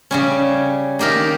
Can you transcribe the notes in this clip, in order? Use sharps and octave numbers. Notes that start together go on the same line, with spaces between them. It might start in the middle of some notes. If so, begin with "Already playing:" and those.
C#3 G3 C#4
D#3 A#3 D#4 G4 A#4